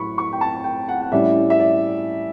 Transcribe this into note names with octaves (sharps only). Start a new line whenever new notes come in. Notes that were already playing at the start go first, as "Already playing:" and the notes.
Already playing: A2 F#3 E4 B5 C#6
C#6
G5
A5
G5
F#5
F#5
A2 G3 C#4 E4 E5
E5
D5